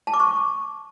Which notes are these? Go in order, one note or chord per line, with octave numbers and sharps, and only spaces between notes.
A5
D6
C#6